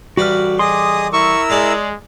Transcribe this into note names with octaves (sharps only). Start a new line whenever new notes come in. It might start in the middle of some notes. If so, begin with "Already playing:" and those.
A1 G3 F#4 B4 F6
G#4 D#5 C6 D6 D#6
E4 A#4 C#6 E6
G#3 G#4 D5 A#5